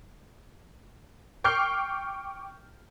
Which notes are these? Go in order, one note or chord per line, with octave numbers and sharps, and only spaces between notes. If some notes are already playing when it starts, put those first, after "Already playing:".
G5 C#6 D6 F6 G6 C7